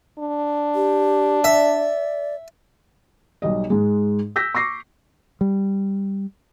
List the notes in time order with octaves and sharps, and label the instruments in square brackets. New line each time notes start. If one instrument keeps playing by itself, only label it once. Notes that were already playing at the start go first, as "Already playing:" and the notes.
[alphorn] D4
[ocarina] G4
[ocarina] D5 [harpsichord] E5
[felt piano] B1 G3 D#5
G#2 G#3
E6 G6 A#6 B6
C#6 D6 A#6 C7
[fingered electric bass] G3